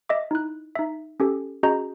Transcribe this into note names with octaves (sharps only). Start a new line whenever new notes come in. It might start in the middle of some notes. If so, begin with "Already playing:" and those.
D#5 E5 D6
D#4 E4 F#6
D#4 E5
C#4 G4 A4
C#4 F#4 G#4 D#5 A#5 G6